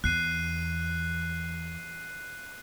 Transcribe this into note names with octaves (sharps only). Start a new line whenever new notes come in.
E2 F#6 C7 D#7